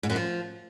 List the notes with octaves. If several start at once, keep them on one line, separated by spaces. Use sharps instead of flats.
G#2
F#2
F3